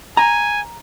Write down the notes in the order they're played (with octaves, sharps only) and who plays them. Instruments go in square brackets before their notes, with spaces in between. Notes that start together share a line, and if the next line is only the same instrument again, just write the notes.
[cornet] G#5 [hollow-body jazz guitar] A#5